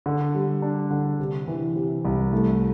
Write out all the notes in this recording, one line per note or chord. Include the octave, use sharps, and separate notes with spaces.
D3
G3
D4
D3
C3
E3
C3
C2
A3